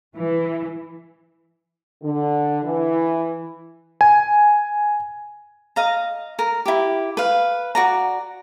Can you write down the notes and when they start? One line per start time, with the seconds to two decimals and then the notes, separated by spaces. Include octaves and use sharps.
0.16 E3
2.03 D3
2.64 E3
4.01 G#5
5.76 D#5 F5 A#5
6.39 A#4
6.66 E4 G4
7.17 B4 F5
7.75 F#4 D5 A#5